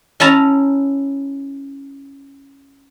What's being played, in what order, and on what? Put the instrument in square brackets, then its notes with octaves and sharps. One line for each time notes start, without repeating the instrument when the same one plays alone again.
[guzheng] C#4 E4 A5 A#5